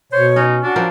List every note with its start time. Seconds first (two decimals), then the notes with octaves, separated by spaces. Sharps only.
0.12 B2 C5 C#5
0.36 C#4 D#4
0.63 D4 F#4
0.76 F3 C4 A#4